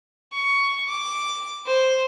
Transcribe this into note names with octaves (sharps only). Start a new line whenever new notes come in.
C#6
D6
C5